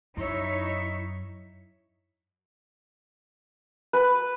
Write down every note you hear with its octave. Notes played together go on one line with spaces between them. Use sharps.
F#2 D#4 E4 C#5 E5
B4